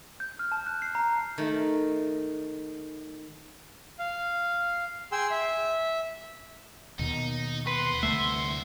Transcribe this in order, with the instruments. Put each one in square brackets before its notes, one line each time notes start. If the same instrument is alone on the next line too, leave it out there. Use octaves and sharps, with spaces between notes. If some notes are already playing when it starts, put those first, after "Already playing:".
[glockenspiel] G6
F6
A5
F#6
C7
A#5
[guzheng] D#3 A3
[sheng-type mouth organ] F5
G#4 G5 C6 E6
E5
[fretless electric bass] D#2 B2 [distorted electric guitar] D#4
[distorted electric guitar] C2 F#5 [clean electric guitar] B4 [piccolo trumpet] C6
[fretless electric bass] D2 A3 [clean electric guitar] E5